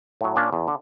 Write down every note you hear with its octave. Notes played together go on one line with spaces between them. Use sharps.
A2 F#3
A#2 A#3 C#4 D4
E2
D3